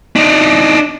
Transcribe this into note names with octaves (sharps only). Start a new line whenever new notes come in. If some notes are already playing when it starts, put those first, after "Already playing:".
D4 D#4